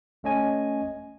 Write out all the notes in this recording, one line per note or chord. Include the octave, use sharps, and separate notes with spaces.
G1 A3 C#4 D#5 G#5